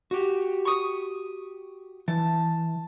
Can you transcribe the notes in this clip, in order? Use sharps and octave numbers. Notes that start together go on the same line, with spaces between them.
F#4 G4
C#6 D#6
E3 A5